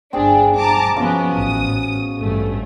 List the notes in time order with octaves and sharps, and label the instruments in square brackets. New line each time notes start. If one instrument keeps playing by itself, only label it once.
[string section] G1 D4 [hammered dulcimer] C4 G#4
[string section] A5 A#5 D6
[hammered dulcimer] B2 C#4 F4 [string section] F3 B3
[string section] A1 D#6
A1 G2 A3